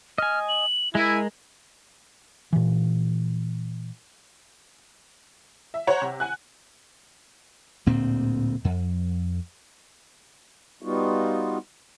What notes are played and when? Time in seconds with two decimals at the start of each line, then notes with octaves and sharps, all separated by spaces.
0.18 D#5 G#5 F6
0.48 F#7
0.95 G#3 E4 A#4 G#5
2.53 A#2 E3
5.74 E5
5.87 C5 C#5 F#5 A#5
6.02 C3
6.20 F#5 G#5 F#6
7.86 D1 D2 A#2 C4
8.65 F2
10.82 G3 B3 D#4 F4 F#4